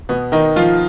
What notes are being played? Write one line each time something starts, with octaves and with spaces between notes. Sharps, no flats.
B2 B3
D#3 D#4
F3 F4